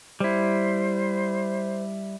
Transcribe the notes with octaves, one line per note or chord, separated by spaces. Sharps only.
G3 E4 C5